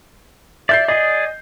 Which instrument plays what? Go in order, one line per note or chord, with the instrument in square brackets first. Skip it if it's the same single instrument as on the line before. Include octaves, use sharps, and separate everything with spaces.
[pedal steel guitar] D5 [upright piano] E5 G6 C7
[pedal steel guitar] G#4 D5 [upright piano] D#5